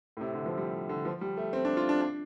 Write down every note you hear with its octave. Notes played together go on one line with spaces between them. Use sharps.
A2
C3
D3
F3
G3
D3
F3
G3
A3
C4
D4
F4
D4
D4